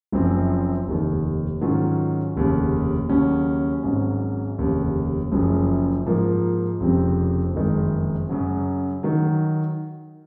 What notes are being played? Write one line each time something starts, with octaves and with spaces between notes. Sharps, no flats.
F#1 F#2 F3 C4
F1 D#2 D#3
G#2 D#3 F#3 C#4 F4
F1 D#2 C#3
D#2 C#3 F#3 C#4
G#1 G#2 F#3 C#4
F1 D#2 C#3
F#1 F#2 C#3 F3
G#2 F3 A#3 F4
F1 F2 C#3 F3 C4
F#1 F2 D#3 G#3 D#4
F#2 C#3 F#3
D#3 F#3